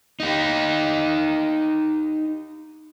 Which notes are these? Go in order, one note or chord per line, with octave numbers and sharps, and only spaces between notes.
D#4 G4